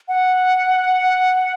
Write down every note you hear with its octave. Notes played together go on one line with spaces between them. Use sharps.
F#5